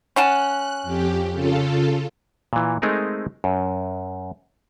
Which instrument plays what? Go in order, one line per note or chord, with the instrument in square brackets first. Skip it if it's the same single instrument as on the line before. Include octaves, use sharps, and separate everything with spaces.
[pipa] C#4 F#5 A5 [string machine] F#6
[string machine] F2 G4
C#3 F4 A4
[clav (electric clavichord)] A#2 E3
G#3 A3 C4 D#4 G#4 A#4
F#2